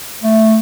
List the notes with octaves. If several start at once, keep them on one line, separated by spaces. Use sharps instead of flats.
A3